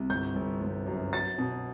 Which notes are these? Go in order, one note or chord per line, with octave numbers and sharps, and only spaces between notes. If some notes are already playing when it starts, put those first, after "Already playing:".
Already playing: C2
G1 G6
G1
G1
F#2
F#3 A6
B2